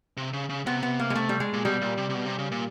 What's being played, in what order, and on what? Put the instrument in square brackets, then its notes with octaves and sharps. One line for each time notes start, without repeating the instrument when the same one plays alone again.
[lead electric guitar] C3
C#3
C#3
[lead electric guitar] C3 [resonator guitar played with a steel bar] B3
[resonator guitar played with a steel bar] B3
A#3
G#3
A3
G3
G#3
[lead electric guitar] A#2
[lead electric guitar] B2 [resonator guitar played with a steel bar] G3
[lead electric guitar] A#2
C3
C3
B2
C3
C#3
A#2